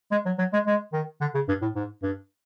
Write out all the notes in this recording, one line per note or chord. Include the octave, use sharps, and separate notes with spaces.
G#3
F#3
F#3
G#3
G#3
D#3
D3
C#3
G2
A2
G#2
G2